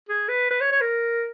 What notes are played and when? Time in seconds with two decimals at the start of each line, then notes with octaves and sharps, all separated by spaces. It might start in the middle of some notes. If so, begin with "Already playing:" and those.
0.09 G#4
0.29 B4
0.51 B4
0.61 C#5
0.71 C#5
0.81 A#4